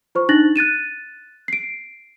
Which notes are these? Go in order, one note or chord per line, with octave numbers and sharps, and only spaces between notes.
F4 C5 C#6
D4 D#4 F#6 A6 A#6 F#7
F#6 A6 D#7 E7
C7 D7